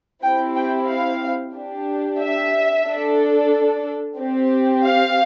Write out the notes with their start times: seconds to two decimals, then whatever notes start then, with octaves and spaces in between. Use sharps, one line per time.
0.22 C4 E4 G4 G5
0.55 G5
0.88 F5
1.54 D4 G4
2.20 E5
2.86 D4 A4
4.18 C4 G4
4.84 F5